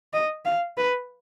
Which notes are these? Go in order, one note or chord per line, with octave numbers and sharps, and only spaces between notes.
D#5
F5
B4